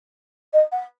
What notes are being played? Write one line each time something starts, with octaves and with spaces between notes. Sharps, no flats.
D#5
F#5